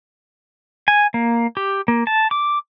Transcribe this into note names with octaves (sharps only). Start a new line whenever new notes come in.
G#5
A#3
G4
A#3
A5
D6